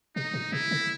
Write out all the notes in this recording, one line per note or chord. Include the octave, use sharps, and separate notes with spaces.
B2 D#4
A#2
C3 E4
C#3